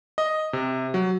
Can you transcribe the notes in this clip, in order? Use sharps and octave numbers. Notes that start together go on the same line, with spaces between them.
D#5
C3
F#3